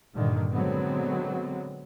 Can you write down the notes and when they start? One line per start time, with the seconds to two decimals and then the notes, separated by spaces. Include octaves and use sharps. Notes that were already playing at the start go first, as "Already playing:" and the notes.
0.14 G2 A#2 D3 D#3
0.52 A#2 D3 F#3 G#3 B3 C4